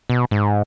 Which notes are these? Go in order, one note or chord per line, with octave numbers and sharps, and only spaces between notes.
B2
G#2